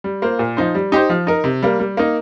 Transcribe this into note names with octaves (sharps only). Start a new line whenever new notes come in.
G3
A#3 F4 C5
A#2
F3 D#4 C5
G3
D#4 G4 C5
F3
D#4 A#4
C3
G3 A#3
G3
A#3 D#4